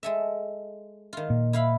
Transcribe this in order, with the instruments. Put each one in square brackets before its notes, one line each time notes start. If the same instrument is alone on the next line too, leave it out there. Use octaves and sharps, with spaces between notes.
[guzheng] G#3 A4 E5
D#3 F4
[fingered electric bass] A#2
[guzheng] E4 F5 B5